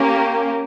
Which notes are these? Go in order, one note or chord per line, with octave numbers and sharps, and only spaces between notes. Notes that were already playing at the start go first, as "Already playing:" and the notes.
Already playing: A#3 C#4 G4